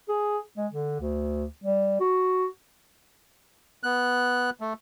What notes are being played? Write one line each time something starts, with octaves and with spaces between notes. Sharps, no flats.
G#4
G#3
D3
D2
G3
F#4
B3 F#6
A3